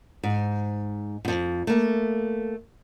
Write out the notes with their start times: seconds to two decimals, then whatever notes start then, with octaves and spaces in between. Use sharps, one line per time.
0.23 G#2
1.25 F2 G#2
1.67 A3 A#3